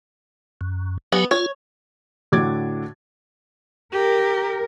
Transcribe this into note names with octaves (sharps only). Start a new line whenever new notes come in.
F#2
F#3 B3 G4 G#5
F4 C#5
A2 D3 F#4 D6 G#6 A6
G4 A#4